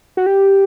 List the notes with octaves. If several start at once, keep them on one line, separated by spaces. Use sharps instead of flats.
F#4
G4